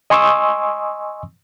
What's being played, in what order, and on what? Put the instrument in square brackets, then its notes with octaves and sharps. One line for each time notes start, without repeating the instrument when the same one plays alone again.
[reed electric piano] D#5 G#5 C6 C#6 D#6 E6